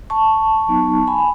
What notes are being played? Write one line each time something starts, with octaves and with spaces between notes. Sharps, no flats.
A5 C#6
F#3 B3 D#4
G#5 B5